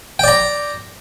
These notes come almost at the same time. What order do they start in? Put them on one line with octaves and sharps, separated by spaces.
G5 D5 A#5